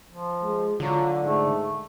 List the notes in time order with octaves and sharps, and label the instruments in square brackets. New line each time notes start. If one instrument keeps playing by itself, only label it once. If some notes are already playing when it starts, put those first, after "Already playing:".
[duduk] F3
[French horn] G#3
[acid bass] D3 [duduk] F#3 [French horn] F4
[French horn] G#2 [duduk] A3